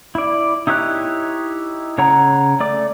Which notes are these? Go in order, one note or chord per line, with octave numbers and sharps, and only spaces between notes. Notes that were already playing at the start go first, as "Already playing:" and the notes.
E4 D5
D#4 E4 G4 C#5 F#6
C#3 C#5 F#5 A#5
A3 D5 D6